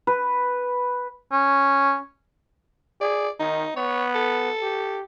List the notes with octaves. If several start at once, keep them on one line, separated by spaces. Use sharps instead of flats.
B4
C#4
G#4 D5
D#3 D#4
B3 C#5
A4
G4